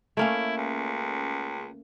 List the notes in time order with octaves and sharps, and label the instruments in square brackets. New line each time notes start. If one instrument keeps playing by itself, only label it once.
[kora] A3 A#3 C#4 [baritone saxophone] E4
[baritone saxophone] C#2